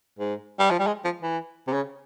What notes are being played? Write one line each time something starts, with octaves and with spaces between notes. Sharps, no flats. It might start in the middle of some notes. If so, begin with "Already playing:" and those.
G#2
G3
F3
G3
G#3
F3
E3
C3
C#3